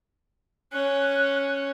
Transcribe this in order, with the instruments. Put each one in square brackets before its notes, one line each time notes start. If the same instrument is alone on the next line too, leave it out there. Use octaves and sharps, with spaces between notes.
[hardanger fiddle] C#4 [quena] F#6